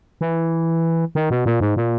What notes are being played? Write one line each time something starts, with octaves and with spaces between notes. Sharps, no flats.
E3
D#3
B2
A#2
G#2
A#2